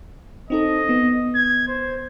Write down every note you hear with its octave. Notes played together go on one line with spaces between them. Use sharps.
C4 D#4 A4 D#5
B3
G#6
C5